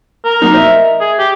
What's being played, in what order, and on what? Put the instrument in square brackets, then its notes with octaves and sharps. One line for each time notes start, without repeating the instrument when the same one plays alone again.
[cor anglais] A#4
[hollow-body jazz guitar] F#3 A#3 D#4
C5 D#5 E5
[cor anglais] G#4
G4